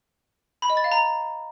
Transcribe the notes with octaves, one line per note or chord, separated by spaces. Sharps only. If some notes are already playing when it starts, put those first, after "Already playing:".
B5
D#5
A6
F5
A#5